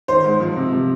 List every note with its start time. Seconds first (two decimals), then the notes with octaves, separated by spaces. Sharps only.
0.08 D#3 C5
0.24 G#2
0.40 F3
0.57 C3
0.72 F3